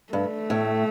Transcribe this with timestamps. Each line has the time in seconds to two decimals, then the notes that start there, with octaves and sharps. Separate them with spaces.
0.13 G2 A3
0.50 A2